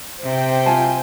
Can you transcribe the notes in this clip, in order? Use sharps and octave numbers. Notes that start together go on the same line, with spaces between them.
C3 C5 G5
F4 G#5 A5